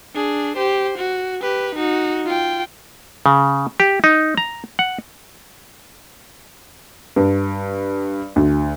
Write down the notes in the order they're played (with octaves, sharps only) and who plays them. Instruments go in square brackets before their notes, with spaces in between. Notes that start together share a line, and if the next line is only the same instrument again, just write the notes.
[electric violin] D4 G#4
G4 C5
F#4
G4 B4
D#4 F#4
F4 G5
[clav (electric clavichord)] C#3
G4
D#4
A#5
F#5
[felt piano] G2
D2